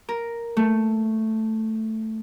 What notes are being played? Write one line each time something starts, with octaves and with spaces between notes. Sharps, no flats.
A#4
A3